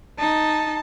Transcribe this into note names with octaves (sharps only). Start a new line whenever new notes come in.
D#4 A5